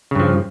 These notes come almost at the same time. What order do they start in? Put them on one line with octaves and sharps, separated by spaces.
C#3 G2 F3